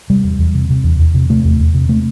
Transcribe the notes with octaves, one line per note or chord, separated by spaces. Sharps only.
C3 G3
E2
E2
C3
C3
E2
E2
C3
C3 A3
E2
E2
C3
C3 A3